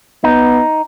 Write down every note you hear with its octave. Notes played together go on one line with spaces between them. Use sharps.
B3 D#4